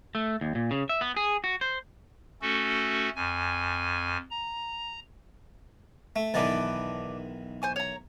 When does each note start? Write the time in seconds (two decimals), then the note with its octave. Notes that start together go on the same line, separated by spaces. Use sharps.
0.15 A3
0.41 D#2
0.55 A#2
0.71 C#3
0.89 E5
1.01 B3
1.17 G#4
1.44 F#4
1.61 C5
2.42 A3 C#4 F#4 A4
3.16 F2 G#5
4.31 A#5
6.16 A3
6.34 B1 D#3 E3 B4 D5 A5
7.62 C5 G#5 C#6
7.76 C#5 A#5